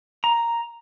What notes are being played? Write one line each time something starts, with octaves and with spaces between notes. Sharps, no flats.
A#5